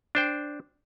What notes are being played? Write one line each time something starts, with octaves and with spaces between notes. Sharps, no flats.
D4 C5 G5